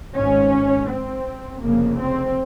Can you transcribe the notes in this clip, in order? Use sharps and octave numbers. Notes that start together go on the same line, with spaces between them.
G#1 G#2 C#4
C4
F1 F2 C#3 A#3
C4